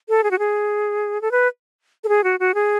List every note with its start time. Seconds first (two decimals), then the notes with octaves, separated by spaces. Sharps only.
0.09 A4
0.24 G#4
0.31 F#4
0.39 G#4
1.22 A4
1.31 B4
2.04 A4
2.09 G#4
2.24 F#4
2.40 F#4
2.54 G#4